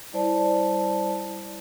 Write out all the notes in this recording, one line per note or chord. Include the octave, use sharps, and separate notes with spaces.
G3 E4 C5 D5 A5